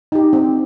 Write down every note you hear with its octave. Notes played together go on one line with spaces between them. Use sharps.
D#4 G4
C4